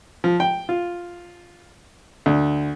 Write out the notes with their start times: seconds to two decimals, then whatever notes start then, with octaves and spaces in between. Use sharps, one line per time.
0.24 F3
0.40 G5
0.69 F4
2.26 D2